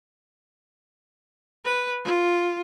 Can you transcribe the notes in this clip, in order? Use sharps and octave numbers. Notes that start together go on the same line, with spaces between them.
B4
F4